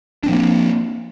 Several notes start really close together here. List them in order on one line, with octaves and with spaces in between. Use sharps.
D4 C4 F3 A#3